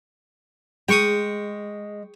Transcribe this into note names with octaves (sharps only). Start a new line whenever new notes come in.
G#3 G5 C#6 D#6